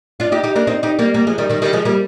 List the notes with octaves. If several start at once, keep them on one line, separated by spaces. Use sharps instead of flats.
D4 F4
D#4 G4
D#4 G4
A#3 D4
C4 D#4
D#4 G4
G3 A#3
G3 A#3
F3 G#3
D#3 G3
D#3 G3
D#3 G3
F3 G#3
G3 A#3